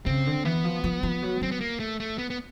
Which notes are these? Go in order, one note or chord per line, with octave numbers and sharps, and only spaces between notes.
C#3 C4
D3
E3 B3
F3
F3
F3
F#3
F#3 C4
B3
A#3
A3
A3
B3
B3